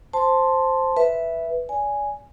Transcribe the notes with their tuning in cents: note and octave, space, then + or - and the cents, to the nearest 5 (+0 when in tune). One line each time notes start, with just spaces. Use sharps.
C5 +0 A5 +0 C6 +0
B4 +0 E5 +0
D5 -30 G#5 +0